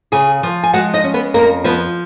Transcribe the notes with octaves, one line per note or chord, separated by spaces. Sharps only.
C#3 G#4 G#5
F3
G#5
G#3 F#4 F#5
D#4 D#5
C#4
B3 B4
F2 A#3 A#4
F3 B3 B4